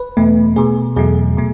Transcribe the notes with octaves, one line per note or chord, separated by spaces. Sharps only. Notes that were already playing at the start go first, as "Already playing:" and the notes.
Already playing: B4
E2 B2 A3
B2 A3 G#4
E2 B2 F#3 A3 G#4
B2 A3